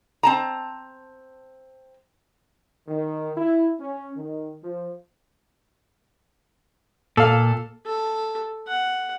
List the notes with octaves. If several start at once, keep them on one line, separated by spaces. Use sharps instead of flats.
C4 A5 A#5
D#3
E4
C#4
D#3
F3
A#2 A4 F5
A4
F#5